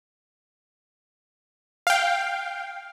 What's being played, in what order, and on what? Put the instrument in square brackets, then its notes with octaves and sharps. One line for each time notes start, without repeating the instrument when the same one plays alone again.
[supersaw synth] F5 G5